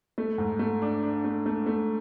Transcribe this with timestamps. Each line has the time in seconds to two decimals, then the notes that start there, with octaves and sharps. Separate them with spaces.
0.18 A3
0.38 G#2
0.59 A3
0.82 D4
1.03 D4
1.24 A3
1.46 A3
1.66 A3